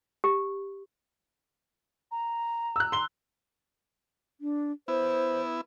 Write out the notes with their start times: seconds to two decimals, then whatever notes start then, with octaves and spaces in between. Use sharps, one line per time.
0.24 G4
2.11 A#5
2.76 E6 F#6
2.92 C6 G7
4.41 D4
4.88 B3 E4 C5